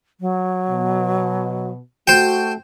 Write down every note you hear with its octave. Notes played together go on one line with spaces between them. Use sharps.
F#3
B2
A3 F#4 C5 G5